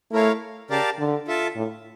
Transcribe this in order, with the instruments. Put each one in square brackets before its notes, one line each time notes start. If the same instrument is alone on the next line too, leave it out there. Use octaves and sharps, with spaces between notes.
[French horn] A3 [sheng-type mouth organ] E4 A#4 C#5 F5
[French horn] C#3 [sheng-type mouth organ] G4 A#4 D5 F5 A5
[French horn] D3
[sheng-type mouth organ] F4 A4 E5 A5
[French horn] A2